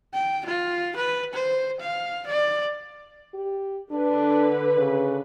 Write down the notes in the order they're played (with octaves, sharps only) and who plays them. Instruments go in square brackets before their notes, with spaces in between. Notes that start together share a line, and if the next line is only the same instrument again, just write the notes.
[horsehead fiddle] G5
F4
B4
C5
F5
D5
[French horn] G4
[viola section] D3 B4 [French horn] D4
[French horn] C#3